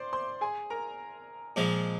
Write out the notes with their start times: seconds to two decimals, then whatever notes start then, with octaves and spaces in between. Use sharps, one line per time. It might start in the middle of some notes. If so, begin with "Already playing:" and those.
Already playing: C5 D5 C6 D6
0.13 C5 C6
0.41 G#4 G#5
0.70 A#4 A#5
1.56 A#2 F3 G#3